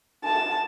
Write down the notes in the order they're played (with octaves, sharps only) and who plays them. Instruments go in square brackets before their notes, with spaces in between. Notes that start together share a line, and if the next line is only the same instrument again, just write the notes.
[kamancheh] A5